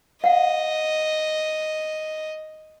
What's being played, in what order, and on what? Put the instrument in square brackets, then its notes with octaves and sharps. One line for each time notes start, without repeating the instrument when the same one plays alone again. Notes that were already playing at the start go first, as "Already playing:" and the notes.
[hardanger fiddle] D#5 [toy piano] F5 F#5